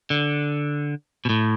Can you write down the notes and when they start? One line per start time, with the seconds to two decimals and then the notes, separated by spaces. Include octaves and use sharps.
0.10 D3
1.25 B2
1.29 A2